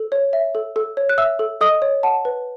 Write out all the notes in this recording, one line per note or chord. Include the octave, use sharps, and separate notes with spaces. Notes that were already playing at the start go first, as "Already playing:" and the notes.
Already playing: A4
C#5
E5
A4
A4
C#5
F#6
E5 E6
A4
A4 D#5 D#6
C#5
F#5 A5
B4